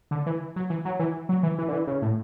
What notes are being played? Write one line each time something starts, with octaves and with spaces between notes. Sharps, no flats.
D3
E3
F#3
E3
F#3
E3
F#3
E3
E3
D3
E3
C#3
A2